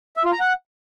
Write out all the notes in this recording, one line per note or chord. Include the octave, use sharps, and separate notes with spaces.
E5
F4
A#5
F#5